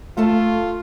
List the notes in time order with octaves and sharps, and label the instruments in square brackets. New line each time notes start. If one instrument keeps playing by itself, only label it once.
[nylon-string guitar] A3 A4 A5 [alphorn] F4